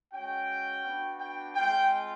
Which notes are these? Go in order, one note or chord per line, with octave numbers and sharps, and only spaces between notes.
G#3 C#4 F#4 G5
B3 D4 F#4
G5
G#3 C4 F4 G5